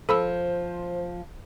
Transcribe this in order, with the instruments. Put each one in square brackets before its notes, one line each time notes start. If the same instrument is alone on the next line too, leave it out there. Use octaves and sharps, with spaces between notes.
[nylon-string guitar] F3 [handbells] A4 B5 E6 [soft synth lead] C5